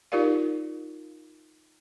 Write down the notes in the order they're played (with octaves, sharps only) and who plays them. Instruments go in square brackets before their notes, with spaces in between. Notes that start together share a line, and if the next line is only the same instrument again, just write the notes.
[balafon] D#4 F4 G4 A#4 D5 F5